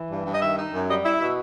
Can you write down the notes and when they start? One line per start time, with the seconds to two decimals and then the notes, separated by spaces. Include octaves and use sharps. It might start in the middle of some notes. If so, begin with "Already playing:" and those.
Already playing: E3
0.10 G2
0.26 G2
0.33 D#5
0.41 D#3 E5
0.58 D#4
0.72 F#2
0.88 G3 D#5
1.04 E4 E5
1.20 B2 E5